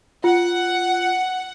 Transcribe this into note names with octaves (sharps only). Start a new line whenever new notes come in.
F4 F#5